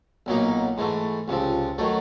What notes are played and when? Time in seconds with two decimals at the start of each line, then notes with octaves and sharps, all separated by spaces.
0.26 B1 A#2 F#3 A#3 D#4
0.78 G#2 E3 A3
1.28 C#2 C3 F3
1.78 D#3 F#3 A3